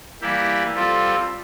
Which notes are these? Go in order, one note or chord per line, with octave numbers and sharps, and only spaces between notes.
E3 G3 A#3 E4 G4
G3 C4 F4 A4